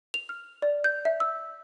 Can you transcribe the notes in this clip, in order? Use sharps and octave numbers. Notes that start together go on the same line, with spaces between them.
F7
F6
D5
G6
E5
E6